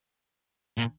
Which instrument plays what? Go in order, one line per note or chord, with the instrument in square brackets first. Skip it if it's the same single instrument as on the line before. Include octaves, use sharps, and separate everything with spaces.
[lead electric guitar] A#2